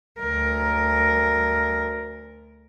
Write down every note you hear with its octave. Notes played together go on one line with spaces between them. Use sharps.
D2 A#4